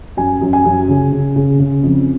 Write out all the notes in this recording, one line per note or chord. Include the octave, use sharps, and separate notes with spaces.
F#2 G#5
F#2
G#5
F#2
C#3
C#3
C#3
C#3
F2